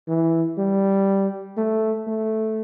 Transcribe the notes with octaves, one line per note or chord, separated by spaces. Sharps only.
E3
G3
A3
A3